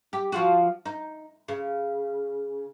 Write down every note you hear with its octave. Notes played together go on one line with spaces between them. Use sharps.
G4
F3 F4 F#4
D#4
C#3